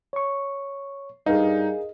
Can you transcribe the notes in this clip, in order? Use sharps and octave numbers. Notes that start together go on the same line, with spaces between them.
C#5 C#6
G2 D#4 G#4 A#4 D#5 F5